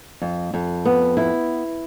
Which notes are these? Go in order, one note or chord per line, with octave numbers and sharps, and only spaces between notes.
F2
F2
B3
E4